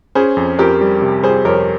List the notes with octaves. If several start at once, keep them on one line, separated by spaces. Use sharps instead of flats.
C#4 G#4 C5
F2
F2 G4 A#4
G3
C3
G3 G#4 C5
F2 A#4 C#5